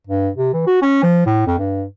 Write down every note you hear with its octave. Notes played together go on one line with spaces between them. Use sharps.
G2
C3
E3
F#4
C#4
F3
A2
F2
G2